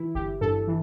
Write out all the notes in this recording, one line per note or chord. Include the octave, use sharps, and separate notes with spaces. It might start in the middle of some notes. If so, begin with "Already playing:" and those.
Already playing: E3 E4
G1 G4
G2 A4
E3